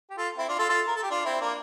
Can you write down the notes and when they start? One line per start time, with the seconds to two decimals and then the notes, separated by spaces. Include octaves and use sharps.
0.10 G4
0.17 F4 A4
0.38 C4 E4
0.48 D4 F4
0.59 F4 A4
0.69 F4 A4
0.87 A#4
0.95 A4
1.03 G4
1.10 D4 F4
1.25 C4 E4
1.40 A#3 D4